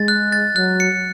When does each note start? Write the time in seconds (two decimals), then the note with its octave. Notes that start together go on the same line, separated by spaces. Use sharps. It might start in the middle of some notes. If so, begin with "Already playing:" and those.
Already playing: G#3 A6
0.08 F#6
0.32 A6
0.56 F#3 F#6
0.80 C#7